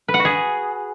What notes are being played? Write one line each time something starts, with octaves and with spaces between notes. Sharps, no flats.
B4
F#5
F#4
G#4